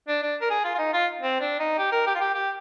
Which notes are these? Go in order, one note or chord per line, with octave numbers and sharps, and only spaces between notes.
D4
D4
A#4
G#4
F4
F4
D#4
F4
C4
D4
D#4
G4
A#4
G4
F4
G4
G4